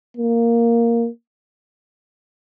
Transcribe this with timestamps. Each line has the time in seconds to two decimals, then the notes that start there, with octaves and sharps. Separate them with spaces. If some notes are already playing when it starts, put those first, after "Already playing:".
0.17 A#3